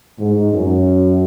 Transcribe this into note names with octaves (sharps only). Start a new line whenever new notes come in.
G#2
F#2